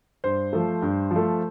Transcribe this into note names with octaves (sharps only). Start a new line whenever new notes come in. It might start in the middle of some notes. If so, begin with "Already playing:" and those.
G2 C5
F3 A3
G2
F3
A3